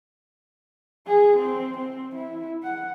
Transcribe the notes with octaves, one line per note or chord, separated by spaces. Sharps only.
G#4
C4
C4
E4
F#5